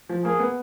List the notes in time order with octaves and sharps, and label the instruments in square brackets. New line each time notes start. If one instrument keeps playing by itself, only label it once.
[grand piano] F3
[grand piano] A#3 [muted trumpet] G#4
[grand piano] B3